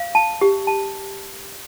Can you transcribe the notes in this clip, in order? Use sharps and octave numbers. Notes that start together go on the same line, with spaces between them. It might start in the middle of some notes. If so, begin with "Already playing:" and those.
Already playing: F5
A5
G4
A5